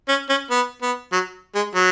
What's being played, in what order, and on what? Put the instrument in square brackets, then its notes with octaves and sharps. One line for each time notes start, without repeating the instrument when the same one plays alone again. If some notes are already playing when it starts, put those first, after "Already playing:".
[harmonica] C#4
C#4
B3
B3
F#3
G#3
F#3